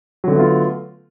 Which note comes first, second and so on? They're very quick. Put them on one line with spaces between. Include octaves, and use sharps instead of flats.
F#3 D3 A3 B3 F4